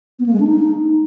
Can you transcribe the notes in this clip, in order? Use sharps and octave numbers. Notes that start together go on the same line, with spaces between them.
B3
A#3
G#3
D4
D#4